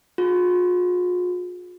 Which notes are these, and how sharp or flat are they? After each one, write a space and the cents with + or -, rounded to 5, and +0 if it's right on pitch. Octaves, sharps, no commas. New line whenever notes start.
F4 +45 G#4 +0